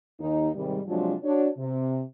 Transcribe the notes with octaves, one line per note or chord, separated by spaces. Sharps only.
D#2 D#4
G#2 C3 D#3 G3
C3 F3 F#3 G#3 D4 F4
D4 F#4 C#5
C3